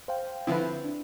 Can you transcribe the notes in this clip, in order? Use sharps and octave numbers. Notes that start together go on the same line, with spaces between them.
C5 F5 G5
D3 F3 C4 E4 B4
D4